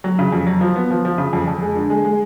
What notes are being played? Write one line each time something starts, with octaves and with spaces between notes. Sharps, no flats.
F#3
C#3
F2
F#3
F3
B3
F3
F3
C#3
F2
F2
G#3
D3
G#3
G#3